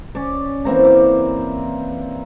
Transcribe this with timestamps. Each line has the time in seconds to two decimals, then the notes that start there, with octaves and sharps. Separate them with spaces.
0.15 C#4 D5
0.65 E3 A#3 C4 A#5
0.84 D6